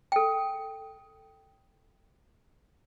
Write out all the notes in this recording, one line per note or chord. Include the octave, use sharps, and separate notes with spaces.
A4 G5